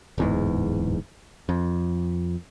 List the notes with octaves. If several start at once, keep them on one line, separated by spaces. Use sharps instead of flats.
D1 E2 G#2
F2